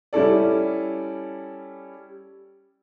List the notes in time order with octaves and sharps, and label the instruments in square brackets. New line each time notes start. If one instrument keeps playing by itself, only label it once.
[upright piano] G3 C#4 E4 A4 D5